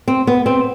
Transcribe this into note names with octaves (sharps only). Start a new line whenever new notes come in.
C4
B3
C4